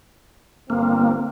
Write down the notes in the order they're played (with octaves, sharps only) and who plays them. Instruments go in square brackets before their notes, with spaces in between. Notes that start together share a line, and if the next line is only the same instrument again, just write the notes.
[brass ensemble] G1 C4 [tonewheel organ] A#3